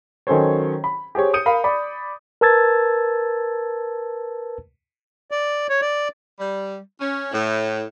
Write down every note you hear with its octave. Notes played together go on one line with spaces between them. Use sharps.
D#3 F#3 C#4 A4 C5 C#5
B5
G4 G#4 C5 C#5
D#6 G6 C#7 D#7
A#4 F5 B5
D5 B5
A#4 B4 A5 E6 G#6 A6
D5
C#5
D5
G3
C#4
A2